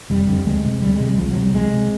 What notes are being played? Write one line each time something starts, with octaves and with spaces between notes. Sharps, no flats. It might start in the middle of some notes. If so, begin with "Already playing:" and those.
F1 G3
F2 D3
D2 G#3
C3
D2 G3
G#3
C3
G3
C2 F3
F#3
C3
G3
C2 G#3
C3